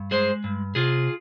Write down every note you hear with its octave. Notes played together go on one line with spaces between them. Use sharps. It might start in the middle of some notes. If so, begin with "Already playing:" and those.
Already playing: G2
G#3 G#4 C5
G2
C3 F4 G#4